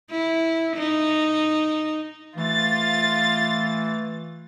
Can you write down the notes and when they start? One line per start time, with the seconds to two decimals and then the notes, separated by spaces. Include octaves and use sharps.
0.10 E4
0.76 D#4
2.37 E3 A3 F4 A6